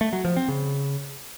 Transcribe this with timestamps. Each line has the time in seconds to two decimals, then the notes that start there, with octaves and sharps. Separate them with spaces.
0.01 A3
0.13 F#3
0.25 F3
0.36 C4
0.48 C#3